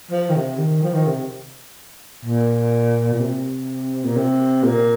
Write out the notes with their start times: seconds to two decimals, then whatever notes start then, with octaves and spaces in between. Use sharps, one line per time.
0.11 F3
0.30 D#3
0.36 C3
0.58 D#3
0.83 F3
0.94 D#3
1.07 C3
2.25 A#2
3.13 A#2
3.21 C3
4.05 A#2
4.17 C3
4.64 A#2